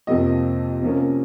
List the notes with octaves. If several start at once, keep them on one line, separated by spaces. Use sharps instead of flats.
F2 C3 F3 A#3 D#5
C3 F3 A#3 C#4